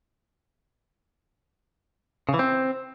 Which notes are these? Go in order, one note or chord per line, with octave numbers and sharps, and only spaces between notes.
C#3
E3
C4